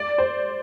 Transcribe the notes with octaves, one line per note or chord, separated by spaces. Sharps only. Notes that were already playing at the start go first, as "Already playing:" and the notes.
Already playing: D5
C5